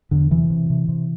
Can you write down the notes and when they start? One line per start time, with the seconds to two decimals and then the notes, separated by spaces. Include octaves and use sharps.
0.11 E2 D3
0.31 C3 E3
0.50 C3
0.70 C3
0.89 C3